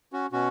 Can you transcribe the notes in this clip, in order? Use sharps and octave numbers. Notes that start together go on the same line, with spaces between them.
C#4 F#4
B2 C#4 F#4